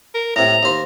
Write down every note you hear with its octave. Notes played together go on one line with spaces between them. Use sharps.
A#4
A2 C3 A#5
D#2 C5